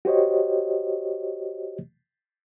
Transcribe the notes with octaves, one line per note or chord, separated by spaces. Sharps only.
F#4 G4 C5 C#5 D#5